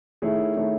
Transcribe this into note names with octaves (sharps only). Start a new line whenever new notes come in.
D#3 A3 E4 G#4 C#5
D#3 A3 E4 G#4 C#5